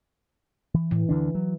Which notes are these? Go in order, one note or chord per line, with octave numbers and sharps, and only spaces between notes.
E3
A2 E3
D2 D3 D4
F#3